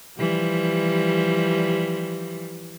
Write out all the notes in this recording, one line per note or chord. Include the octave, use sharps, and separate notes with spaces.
E3 F3 G3